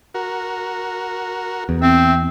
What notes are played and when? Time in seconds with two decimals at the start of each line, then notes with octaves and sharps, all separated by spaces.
0.14 F#4 A#4
1.69 E2
1.82 C4 E5